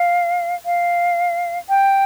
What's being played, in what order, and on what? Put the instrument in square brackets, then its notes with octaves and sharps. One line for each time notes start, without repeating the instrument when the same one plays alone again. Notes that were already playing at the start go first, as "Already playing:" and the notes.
Already playing: [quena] F5
F5
G5